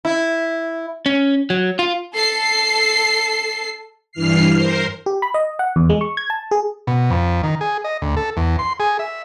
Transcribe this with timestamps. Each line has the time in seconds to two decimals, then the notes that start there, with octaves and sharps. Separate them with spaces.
0.05 E4
1.06 C#4
1.50 F#3
1.79 F4
2.15 A4 C7
4.12 G2 E3 F6 C7
4.54 A#4 C5
5.06 G4
5.22 B5
5.34 D#5
5.59 F#5
5.76 E2
5.90 G#3
6.01 C#6
6.17 G#6
6.30 A5
6.51 G#4
6.87 B2
7.10 F2
7.43 D#3
7.61 G#4
7.84 D#5
8.02 D2
8.17 A4
8.37 E2
8.59 C6
8.80 G#4
8.99 E5